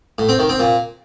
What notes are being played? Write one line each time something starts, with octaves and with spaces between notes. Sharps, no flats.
A2
C4
D#3
C4
A#2